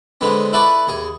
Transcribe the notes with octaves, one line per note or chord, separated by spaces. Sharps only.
D3 G#3 B3 C4
E4 A4 B4 D5 E5 C#6
D#2 G#4